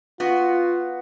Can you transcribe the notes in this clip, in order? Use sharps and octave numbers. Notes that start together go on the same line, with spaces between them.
B3 F4 F#4